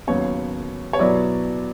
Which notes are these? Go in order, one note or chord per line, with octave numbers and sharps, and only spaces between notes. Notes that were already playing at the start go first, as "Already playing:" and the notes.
D#2 C#3 F#3 B3 C#5
C#5
B2 F#3 B3 E4 D5